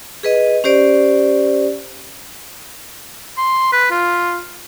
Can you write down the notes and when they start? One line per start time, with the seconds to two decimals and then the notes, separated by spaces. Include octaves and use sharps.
0.23 G#4 B4 D#5
0.64 C#4 G4 C5 D5
3.37 C6
3.72 B4
3.91 F4